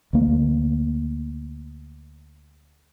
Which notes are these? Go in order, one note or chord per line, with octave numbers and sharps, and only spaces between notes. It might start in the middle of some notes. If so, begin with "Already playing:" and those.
D2 A#3